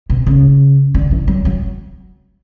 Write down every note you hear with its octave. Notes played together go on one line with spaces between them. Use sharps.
B2
C#3
D3
E3
F#3
F#3